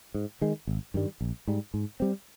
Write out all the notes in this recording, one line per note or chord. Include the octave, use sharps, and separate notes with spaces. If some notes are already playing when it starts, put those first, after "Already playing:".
G#2
D#3 G#3
G#1
G2 D#3 G3
A#1
G#2 G3
G#2
G3 C4